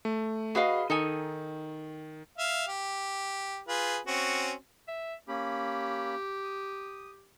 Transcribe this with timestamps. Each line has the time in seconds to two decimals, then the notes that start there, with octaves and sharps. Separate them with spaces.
0.05 A3
0.55 F#4 G#4 B4 D#5 F5
0.90 D#3 D#4 A4 G#5
2.38 E5 F5
2.68 G4
3.68 F4 G#4 B4
4.07 C4 C#4 F#4
4.88 E5
5.28 A#3 C#4 G4 B5
6.44 D#6